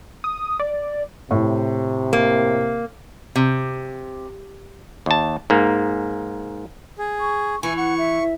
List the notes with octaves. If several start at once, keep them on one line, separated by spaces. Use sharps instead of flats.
D#6
D5
A2 C3
A#3
C3
D#2 A5
G#2 A#3
G#4
C#6
E3 E4 G#5 C#6
F#5 C#6
E5